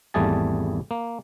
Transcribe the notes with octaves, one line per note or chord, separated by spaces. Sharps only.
G#1 E2 G3 A3 G#4 A5
A#3